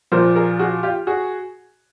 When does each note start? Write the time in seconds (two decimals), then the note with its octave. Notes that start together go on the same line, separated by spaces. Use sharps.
0.12 A#2 F3 A#4 C5
0.36 G#4 A#4
0.59 F#4 G#4
0.83 F4 G4
1.07 F#4 G#4